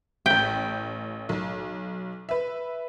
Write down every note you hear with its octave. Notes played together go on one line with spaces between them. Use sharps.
A1 G5 B6
B1
B4 E5